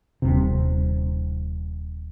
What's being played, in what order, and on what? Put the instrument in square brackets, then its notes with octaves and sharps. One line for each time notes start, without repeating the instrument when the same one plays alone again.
[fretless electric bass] D#1 G#1 C3